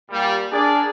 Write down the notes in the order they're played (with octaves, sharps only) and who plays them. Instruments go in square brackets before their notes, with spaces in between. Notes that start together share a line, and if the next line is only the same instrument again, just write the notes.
[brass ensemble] A#2 G3
[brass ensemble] D4 A#4 D5 [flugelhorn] G#4